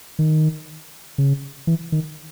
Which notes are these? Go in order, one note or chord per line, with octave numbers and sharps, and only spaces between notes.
D#3
C#3
E3
D#3